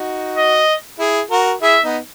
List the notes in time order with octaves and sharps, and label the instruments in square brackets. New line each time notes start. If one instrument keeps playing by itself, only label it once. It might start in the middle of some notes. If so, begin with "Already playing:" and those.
Already playing: [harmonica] D#4 F#4
[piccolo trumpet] D#5
[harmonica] E4 G#4
F#4 A#4
[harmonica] E4 G#4 [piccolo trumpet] E5
[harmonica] B3 D#4